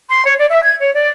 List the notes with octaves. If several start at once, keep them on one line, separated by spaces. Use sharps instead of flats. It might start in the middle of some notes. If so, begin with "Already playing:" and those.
C6
C#5
D5
E5
G#6
C#5
D5